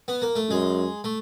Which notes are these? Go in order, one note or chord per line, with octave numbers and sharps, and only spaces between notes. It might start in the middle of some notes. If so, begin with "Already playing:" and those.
B3
A#3
A3
F#2 G#3
A3